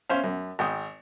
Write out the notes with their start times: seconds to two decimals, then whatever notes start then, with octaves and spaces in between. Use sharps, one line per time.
0.09 C#4 C5 E5 F5
0.24 F#2
0.59 G#1 G5 D#6